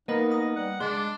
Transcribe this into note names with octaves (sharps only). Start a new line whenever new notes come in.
A#3 B3 D#4 A#4 D#5 B5
D#5 D#6
G3 F#5
C#3 G#3 D4 C6